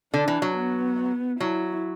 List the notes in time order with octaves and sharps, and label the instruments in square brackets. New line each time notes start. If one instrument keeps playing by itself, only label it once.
[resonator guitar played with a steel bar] D3 [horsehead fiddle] D4
[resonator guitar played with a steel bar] E3
F#3
[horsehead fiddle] B3
[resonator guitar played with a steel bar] F#3 [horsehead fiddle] E4